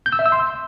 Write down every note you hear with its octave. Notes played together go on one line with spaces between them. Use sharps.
G6
E6
E5
E6
C6